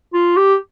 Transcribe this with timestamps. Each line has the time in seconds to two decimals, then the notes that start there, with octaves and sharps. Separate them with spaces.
0.14 F4
0.36 G4